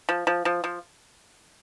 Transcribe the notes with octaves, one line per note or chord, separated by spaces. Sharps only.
F3
F3
F3
F3